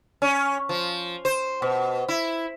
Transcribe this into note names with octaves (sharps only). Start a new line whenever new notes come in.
C#4
F3
C5
B2
E4